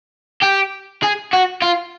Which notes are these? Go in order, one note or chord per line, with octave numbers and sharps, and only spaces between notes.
G4
G#4
F#4
F4